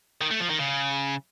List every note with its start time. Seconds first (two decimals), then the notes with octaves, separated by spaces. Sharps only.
0.21 D#3
0.31 A3
0.40 F3
0.50 D#3
0.59 C#3